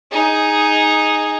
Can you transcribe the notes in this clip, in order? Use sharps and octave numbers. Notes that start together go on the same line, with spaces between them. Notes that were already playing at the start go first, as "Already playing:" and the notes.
D#4 G#4